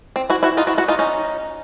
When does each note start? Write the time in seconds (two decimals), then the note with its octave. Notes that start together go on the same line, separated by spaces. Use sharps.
0.16 C4
0.30 E4 F#4
0.43 E4 F#4
0.57 D#4 F4
0.67 E4 F#4
0.78 E4 F#4
0.88 D#4 F4
0.99 C#4 D#4